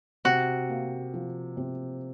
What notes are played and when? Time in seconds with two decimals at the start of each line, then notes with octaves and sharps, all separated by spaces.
0.25 C3 F#4
0.69 A#3
1.14 F3
1.57 C3